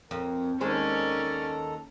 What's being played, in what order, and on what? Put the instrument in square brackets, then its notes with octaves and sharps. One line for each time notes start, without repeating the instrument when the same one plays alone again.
[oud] F2 [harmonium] A#4
[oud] D#2 G#3 C5 [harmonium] D#3 A4 A#5 [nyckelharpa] C#4 D5